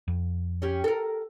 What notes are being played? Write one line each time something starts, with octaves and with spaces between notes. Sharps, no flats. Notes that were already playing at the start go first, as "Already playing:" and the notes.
F2
C#4 G4
A4 A#4